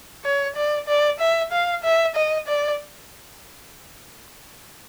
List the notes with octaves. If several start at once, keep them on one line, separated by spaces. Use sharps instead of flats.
C#5
D5
D5
E5
F5
E5
D#5
D5